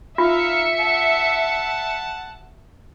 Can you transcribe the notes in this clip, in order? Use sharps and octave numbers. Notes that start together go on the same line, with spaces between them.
D#4 F4 E5 F5 C#7
F#5 A5